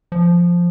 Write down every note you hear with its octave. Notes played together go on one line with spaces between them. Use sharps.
F3